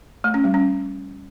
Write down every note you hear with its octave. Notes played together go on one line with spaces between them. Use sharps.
A3
C#4
G3
C#4